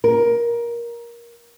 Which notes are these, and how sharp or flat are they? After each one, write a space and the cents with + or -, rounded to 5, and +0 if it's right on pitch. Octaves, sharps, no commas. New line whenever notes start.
A#4 +15